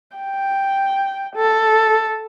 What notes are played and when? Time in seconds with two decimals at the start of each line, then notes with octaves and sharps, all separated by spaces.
0.17 G5
1.36 A4